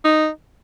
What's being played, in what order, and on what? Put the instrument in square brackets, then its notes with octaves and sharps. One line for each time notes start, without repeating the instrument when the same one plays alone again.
[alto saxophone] D#4